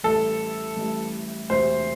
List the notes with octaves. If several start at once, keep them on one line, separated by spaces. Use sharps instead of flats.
A1 A2 G3 A4
A1 A2 G3
E1 D2 C3 C5